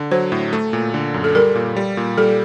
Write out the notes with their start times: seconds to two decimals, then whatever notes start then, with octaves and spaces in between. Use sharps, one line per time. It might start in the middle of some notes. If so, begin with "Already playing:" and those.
Already playing: D3
0.11 F#3 C5
0.32 A2
0.53 A3
0.73 A#2
0.94 D3
1.14 F#2
1.24 A4
1.35 G3 A#4
1.55 A#2
1.76 G3
1.97 A#2
2.18 G3 A4